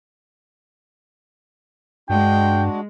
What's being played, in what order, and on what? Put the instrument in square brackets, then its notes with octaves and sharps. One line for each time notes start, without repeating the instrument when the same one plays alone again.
[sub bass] G2 [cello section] G#3 [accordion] D4 F#4 [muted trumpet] G5